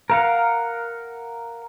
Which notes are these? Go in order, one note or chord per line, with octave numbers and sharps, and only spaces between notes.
A#4 F5 F#5